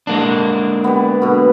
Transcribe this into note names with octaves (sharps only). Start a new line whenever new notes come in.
G#3 A#3 D4
G3 B3
B2 D3